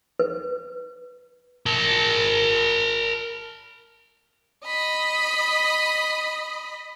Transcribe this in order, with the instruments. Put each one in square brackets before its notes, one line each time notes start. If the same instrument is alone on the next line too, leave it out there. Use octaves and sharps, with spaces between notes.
[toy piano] B4
[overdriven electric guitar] A#4 A5
[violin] D#5 B5